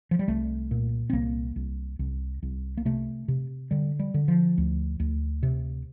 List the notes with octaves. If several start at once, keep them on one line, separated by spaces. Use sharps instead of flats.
F3
G3
C2 A3
A#2
C4
C2 A#3
C2
C2
C2
A#3
C3 A3
C3
D3 G3
G3
D3
F3
D2
D2
C3